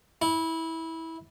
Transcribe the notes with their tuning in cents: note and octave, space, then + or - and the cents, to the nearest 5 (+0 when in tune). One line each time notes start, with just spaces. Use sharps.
E4 -20